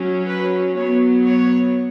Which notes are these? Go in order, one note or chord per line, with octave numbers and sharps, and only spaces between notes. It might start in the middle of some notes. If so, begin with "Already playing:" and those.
Already playing: F#3 C#4
B4
F#3 B3 C#5
C#5